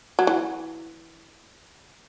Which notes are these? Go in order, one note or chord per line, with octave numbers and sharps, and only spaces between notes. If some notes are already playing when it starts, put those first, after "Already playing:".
F#3
E3